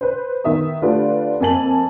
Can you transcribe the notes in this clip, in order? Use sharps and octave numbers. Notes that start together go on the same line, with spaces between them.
B4 C5
D#3 B3 E5 D#6
D3 A3 F4 G4 B4 D5
F2 A#3 G#5 A5 F#7